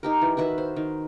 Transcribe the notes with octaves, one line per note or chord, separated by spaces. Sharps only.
D#4 G4 A#4
E3
D#3 F#4 B4 E5
C5
D#3